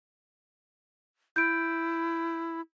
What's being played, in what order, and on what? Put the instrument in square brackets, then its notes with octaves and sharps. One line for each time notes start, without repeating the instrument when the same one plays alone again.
[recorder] E4 [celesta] G6 D7